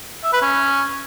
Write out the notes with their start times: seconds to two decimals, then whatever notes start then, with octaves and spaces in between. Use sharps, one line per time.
0.24 E5
0.33 B4
0.42 C#4